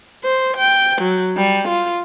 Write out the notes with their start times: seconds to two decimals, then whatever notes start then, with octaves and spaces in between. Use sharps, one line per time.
0.23 C5
0.56 G5
1.01 F#3
1.37 G3
1.68 F4